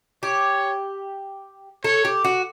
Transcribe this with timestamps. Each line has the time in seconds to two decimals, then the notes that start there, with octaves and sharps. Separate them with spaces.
0.23 G4 C#5
1.84 A4 C#5
2.05 G4
2.25 F#4